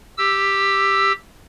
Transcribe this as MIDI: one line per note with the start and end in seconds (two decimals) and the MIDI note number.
0.18 1.12 67
0.18 1.12 88